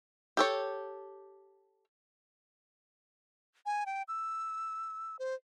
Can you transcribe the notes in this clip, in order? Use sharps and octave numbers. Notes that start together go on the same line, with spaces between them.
G4 A4 C#5
G#5
G5
E6
C5